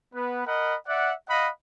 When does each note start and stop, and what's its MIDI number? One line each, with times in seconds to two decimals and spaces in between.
0.14 0.42 59
0.14 0.42 71
0.46 0.75 70
0.46 0.75 75
0.46 0.75 78
0.46 0.75 83
0.87 1.13 74
0.87 1.13 76
0.87 1.13 78
1.29 1.49 75
1.29 1.49 77
1.29 1.49 78
1.29 1.49 83